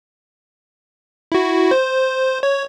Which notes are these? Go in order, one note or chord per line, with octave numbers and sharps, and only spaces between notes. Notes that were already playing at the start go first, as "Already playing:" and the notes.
E4 F#4
C5
C#5